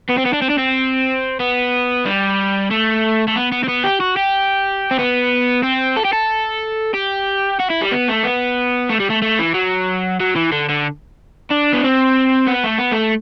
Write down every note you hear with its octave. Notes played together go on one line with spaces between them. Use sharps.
B3
C4
B3
D4
C4
D4
C4
B3
G3
A3
A3
B3
B3
C4
B3
G4
F#4
G4
C4
B3
C4
A4
G4
A4
G4
F#4
E4
G3
B3
A3
B3
A3
G3
A3
A3
E3
F#3
F#3
E3
D3
D3
D4
B3
C4
B3
A3
B3
A3